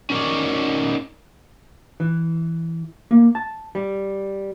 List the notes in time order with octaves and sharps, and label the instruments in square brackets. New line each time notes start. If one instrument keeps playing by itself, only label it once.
[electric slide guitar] C#4 D#4 A#4 C#5 D5
[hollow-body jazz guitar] E3
A#3
A5
G3